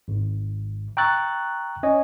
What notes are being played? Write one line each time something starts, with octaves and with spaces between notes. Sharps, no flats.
G#1
G5 A#5 C#6 E6 F#6 A6
C#4 C#5 D#5 G#5